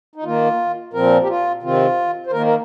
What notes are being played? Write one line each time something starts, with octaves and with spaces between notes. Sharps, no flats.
D#4
D#3 A#3 F4
A#2 F3 C4 A#4
G4
F4
C3 D#3 C4 F4
C5
D#3 A#3 A#4
A#4